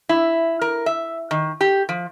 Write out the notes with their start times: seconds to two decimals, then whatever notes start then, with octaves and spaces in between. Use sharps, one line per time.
0.09 E4
0.61 A#4
0.86 E5
1.31 D#3
1.61 G4
1.89 F3